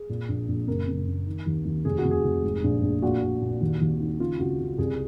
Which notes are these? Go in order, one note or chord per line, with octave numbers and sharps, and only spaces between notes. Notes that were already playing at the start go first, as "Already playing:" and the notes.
Already playing: G#4
A#2
A#1
A#1
F#1 A#4
F#1
F#1
D#3
D#2
D#2
F1 G#4
F#4
F1
G#4
F1
G#2
A#1
A#1
A#2 F#4
A#2
A#2
D#2
D#2
D#3
C#3 F4
C#2 F#4
C#2
C2 G#4